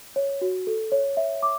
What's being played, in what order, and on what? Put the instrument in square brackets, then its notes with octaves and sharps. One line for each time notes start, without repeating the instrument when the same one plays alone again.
[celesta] C#5
F#4
A4
C#5
E5
D6